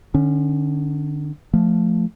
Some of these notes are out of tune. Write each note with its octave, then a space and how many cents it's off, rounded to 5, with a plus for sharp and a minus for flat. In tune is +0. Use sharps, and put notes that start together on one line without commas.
D3 +35 C#4 +0
F3 +0 A3 +0